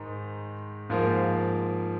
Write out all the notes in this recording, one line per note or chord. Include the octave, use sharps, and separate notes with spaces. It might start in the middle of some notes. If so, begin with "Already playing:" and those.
Already playing: G#2 D#3 G#3
G#2 F3 A#3 F5